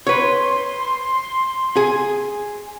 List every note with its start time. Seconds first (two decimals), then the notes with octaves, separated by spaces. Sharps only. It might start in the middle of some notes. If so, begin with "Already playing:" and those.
0.07 B4 C#5 C6
1.77 G#4